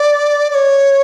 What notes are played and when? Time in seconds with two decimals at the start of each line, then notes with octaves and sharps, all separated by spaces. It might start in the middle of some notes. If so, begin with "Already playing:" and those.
Already playing: D5
0.50 D5
0.55 C#5